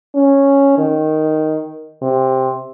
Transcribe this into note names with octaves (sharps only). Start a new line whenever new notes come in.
C#4
D#3
C3